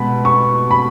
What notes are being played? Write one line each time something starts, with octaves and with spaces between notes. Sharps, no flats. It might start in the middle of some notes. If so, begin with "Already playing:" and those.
Already playing: B2 G#3 B5
C#6
B5